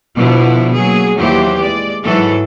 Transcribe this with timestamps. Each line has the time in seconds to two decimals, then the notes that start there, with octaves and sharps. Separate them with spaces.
0.17 B2 D3 F3 D4 E4
0.75 F#3 A#3 G#4
1.16 D#2 E3 F#3 G4 C5
1.61 G#3 D5
2.04 G#2 E3 F#3 A4